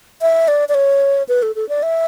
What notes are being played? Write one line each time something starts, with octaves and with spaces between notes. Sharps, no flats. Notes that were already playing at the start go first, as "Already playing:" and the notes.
E5
D5
D5
C#5
B4
A4
A4
D5
E5